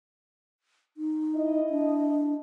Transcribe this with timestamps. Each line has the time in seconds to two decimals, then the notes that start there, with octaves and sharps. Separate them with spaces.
0.97 D#4
1.35 E4 D#5
1.70 D4